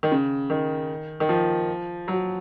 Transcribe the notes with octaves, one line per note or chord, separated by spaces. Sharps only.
D#3
C#3
D#3
D#3
F3
F#3